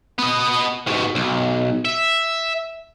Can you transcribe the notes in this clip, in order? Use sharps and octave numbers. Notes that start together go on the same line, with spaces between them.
B3 D#5
G#2 B2
B1
E5